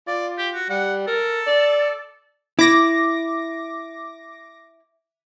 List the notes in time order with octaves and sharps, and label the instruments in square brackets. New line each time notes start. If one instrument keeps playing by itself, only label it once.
[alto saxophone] F4 [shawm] D5
[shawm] G4
F#4
[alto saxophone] G3 [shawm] F#5
[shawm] A4 [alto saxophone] A#4
[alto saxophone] D5
[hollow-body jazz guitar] E4 [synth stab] D6 A#6